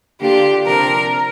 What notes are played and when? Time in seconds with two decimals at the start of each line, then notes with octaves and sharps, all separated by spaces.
0.20 D3 A#3 D4 F4 G4
0.66 C3 F3 D4 A#4